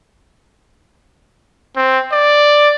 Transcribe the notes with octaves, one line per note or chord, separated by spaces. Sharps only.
C4
D5